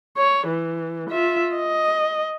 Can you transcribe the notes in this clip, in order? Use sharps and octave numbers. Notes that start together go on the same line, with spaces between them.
C#5
E3
F4 E5
D#5